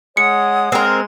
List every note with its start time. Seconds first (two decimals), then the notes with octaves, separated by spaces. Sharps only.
0.17 G#3 C#5 F#5 D#6 C#7
0.72 G#3 C4 A#4